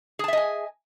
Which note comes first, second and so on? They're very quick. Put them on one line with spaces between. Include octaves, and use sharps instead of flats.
G#4 A5 E5 D#5 G#5